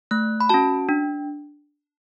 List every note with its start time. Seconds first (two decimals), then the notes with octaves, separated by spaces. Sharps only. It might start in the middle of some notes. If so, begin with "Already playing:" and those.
0.11 A3 F#6
0.40 B5
0.49 C#4 F#4 A5
0.89 D4